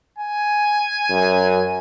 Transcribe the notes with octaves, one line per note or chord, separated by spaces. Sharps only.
G#5
F#2